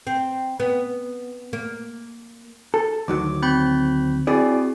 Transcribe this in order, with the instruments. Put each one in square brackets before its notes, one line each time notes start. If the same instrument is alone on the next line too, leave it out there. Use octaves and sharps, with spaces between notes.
[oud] C4
B3
A#3
[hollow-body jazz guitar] A4
[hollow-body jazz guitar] D2 D#3 F#3 [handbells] D6
[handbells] C4 B5 G6
[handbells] C4 F#4 [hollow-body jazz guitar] E4 G#4 D5